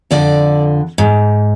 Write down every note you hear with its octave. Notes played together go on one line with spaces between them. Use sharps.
F2 D3 D5
G#2